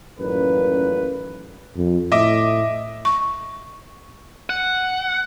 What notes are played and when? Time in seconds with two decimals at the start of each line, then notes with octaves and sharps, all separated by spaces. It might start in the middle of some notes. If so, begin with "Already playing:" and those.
0.19 A1 F#2 A#2 D#3 A#4 B4
1.77 F2
2.12 A2 D#5 E5 D6
3.05 C#6
4.50 F#5